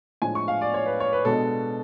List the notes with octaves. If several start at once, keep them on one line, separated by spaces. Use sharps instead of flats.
A2 F3 G#3 D4 G#5
C#6
F5
D5
C#5
B4
C#5
B4
B2 G#3 B3 D4 A4